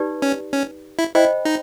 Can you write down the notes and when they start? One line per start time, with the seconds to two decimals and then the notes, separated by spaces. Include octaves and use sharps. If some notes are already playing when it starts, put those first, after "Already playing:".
Already playing: D#4 G4 B4 D5
0.22 C#4
0.53 C#4
0.99 E4
1.15 E4 C5 D#5 G5 B5
1.45 D#4